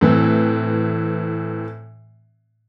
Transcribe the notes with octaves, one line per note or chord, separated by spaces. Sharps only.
A2 E3 C4